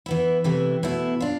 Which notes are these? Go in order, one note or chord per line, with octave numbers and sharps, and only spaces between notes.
E3 B3 E4
C3 E3 A3 E4
B2 A3 E4
D4 F4